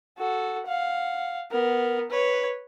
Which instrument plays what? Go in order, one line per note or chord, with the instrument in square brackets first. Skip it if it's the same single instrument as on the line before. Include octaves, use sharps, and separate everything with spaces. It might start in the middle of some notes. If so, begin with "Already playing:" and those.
[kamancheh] F#4 A4
F5 F#5
B3 A#4
B4 C#5